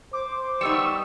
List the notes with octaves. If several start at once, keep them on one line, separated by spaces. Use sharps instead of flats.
C5 D6
G3 B3 D#4 C#6 E6